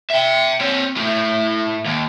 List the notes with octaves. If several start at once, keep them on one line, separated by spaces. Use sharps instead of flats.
E5 G5
C4 C#5
A2 A3
D#2